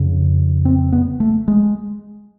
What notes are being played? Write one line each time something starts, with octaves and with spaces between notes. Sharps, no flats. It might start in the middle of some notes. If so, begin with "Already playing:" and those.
Already playing: F2 C#3
C4
B3
A3
G#3